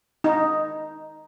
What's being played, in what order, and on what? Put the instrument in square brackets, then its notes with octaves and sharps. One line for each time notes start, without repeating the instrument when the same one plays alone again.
[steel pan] D#4